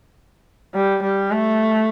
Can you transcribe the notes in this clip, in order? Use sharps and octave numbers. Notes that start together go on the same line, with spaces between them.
G3
G3
A3